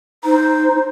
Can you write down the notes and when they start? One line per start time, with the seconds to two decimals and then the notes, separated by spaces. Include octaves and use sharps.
0.24 D#4 C5